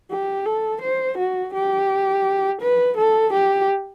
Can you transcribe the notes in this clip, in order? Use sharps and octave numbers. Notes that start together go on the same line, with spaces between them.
G4
A4
C5
F#4
G4
B4
A4
G4